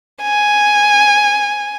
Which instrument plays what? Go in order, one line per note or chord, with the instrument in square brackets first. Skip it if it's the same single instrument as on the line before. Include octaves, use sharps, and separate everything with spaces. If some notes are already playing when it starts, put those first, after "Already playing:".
[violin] G#5